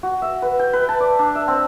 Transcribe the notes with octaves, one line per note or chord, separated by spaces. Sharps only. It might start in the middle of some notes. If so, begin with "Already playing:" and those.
F#4
E5
B4
G5
B4
A5
D5
D4
E5
C4